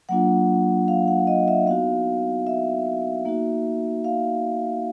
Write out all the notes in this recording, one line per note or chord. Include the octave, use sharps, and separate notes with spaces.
F#3 A#3 D4 F4 F#5
F5
F#5
D#5
E5
B3 D#4 F#4 F5
E5
A#3 D#4 F#4
F5